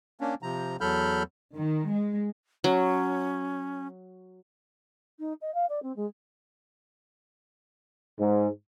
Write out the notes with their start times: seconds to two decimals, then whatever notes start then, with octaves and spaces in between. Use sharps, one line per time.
0.21 A#3 C#4 D4
0.43 C3 F3 A#5
0.81 E2 F#3 A4 B5 F6 G6
1.55 D#3
1.90 G#3
2.64 F#3 C#4
5.19 D#4
5.41 D#5
5.54 F5
5.69 D5
5.82 C4
5.96 G#3
8.19 G#2